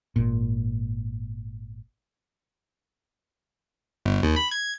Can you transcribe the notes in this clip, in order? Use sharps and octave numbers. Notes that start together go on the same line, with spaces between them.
G#1 A#2
G1
D#2
B5
G#6